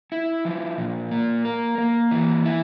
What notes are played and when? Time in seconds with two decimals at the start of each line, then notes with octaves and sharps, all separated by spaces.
0.12 E4
0.45 F3
0.78 A#2
1.11 A#3
1.45 A#4
1.78 A#3
2.11 E3
2.45 E4